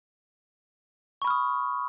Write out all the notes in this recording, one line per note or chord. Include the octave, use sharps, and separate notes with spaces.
B5 C#6 D#6 F6